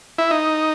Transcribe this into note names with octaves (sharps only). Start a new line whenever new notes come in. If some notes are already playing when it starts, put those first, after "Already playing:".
E4
D#4